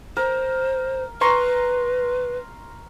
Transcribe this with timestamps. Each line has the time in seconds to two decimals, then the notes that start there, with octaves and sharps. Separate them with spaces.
0.17 A#4 C5
1.21 B4 A#5 C6 C#6